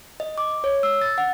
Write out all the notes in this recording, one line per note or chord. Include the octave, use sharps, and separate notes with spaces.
D#5
D6
C#5
E6
A6
F#5